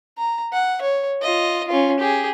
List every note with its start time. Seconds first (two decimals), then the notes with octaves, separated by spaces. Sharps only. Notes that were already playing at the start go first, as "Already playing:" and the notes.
0.18 A#5
0.53 F#5
0.82 C#5
1.22 F4 D#5
1.68 C#4 F4
1.99 G4 G#4